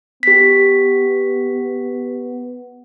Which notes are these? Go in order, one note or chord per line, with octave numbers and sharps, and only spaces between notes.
B3 G4 B6